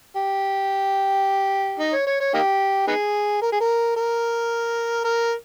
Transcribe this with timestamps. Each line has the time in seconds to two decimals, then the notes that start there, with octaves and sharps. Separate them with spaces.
0.16 G4
1.79 D#4
1.93 C#5
2.07 C#5
2.21 C#5
2.34 A#3 D#4 G4
2.88 B3 D#4 G#4
3.42 A#4
3.52 G#4
3.60 A#4
3.96 A#4
5.04 A#4